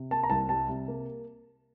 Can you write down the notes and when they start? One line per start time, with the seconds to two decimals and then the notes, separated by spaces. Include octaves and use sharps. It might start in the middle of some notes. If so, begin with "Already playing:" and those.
Already playing: C3
0.11 A#3 A5
0.23 A#5
0.30 C2 A5
0.49 G3 A5
0.69 C3
0.88 A#3